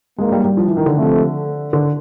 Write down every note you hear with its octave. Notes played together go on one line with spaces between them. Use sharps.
G#1 G2 D#3 F#3 G#3 A#3
G3
G3
F3
E3
D#3
D3
C3 F3 A3
D3